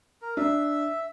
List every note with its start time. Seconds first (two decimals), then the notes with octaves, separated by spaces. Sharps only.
0.22 A#4
0.37 D4 E5